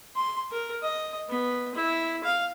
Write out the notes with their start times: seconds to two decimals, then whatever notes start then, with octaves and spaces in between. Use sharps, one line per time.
0.16 C6
0.51 A#4
0.83 D#5
1.29 B3
1.75 E4
2.24 F5